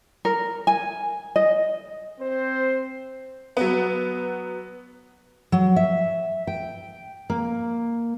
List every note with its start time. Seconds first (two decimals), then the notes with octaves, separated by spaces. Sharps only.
0.25 A#4
0.67 G#5
1.36 D#5
2.19 C4 C5
3.57 F#3 B3
5.52 F#3
5.76 E5
6.47 G5
7.30 A#3